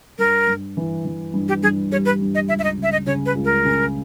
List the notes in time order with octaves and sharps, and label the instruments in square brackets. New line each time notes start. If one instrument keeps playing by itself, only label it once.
[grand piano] G2 [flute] A#4
[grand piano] G2
E3
E3
G2
[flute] G4
[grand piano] G2 [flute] G#4
[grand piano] G3 [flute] C#5
[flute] B4
[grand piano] G2
[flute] D#5
[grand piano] C#2 [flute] E5
[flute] E5
D#5
[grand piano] C#3
[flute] E5
D#5
[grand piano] C#3 [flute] C#5
[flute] B4
[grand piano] C#2
[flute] A#4
[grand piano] C#3